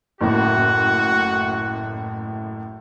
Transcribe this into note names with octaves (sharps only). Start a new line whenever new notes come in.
F#1 A2 F#4